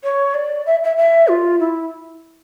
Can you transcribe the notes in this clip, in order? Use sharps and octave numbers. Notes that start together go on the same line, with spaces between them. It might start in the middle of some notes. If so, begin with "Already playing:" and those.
C#5
D5
E5
E5
E5
F4
E4